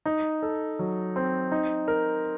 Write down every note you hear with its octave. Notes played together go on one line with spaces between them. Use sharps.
D#4
A4
F#3
C4
D#4
A#4